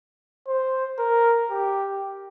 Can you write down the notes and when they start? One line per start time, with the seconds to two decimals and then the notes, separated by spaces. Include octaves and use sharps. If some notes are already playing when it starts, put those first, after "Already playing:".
0.48 C5
0.99 A#4
1.51 G4